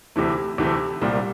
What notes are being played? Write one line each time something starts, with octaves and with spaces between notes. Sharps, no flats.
D2 C3 E3 A3
D2 C3 E3 A3
C2 A#2 G3